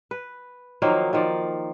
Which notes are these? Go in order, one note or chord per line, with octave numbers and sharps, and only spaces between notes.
B4
D#3 F3 F#3 A#3
D#3 F3 D5